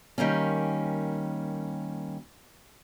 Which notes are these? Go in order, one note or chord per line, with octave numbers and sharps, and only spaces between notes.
D#3 G3 A#3 C#4